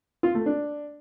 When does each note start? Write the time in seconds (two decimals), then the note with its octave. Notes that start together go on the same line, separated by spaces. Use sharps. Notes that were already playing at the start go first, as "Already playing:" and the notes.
0.23 F4
0.35 A3
0.46 D4